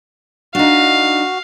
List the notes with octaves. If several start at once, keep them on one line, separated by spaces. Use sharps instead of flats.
D4 D#4 F#4 F5